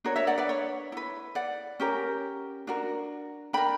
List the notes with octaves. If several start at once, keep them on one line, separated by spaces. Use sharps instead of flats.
D4 F#4 A#4 C#5
C#5 E5
D5 F#5
B4 D5
C#5
E4 B4
D5 F#5
C#4 G4 A#4
D4 F#4 A#4
D4 A#4 G5 B5